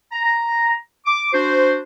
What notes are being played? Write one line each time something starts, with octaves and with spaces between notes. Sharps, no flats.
A#5
D6
D4 F#4 C5